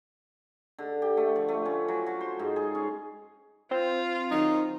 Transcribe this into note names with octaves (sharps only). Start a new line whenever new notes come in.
D3
G4
A3
F3
A3
C#4
F#3
F#3
C5
G#2
G#4
C#4
C4 F4 C5
D#3 F#3 D#4